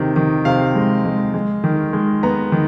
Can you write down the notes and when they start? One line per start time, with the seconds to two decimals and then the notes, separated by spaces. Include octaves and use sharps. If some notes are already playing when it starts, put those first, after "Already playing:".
Already playing: C3 D#3
0.16 D#3
0.45 C3 F5
0.75 G#3
1.05 G#3
1.34 G#3
1.64 D#3
1.93 G#3
2.23 B3 A#5
2.52 D#3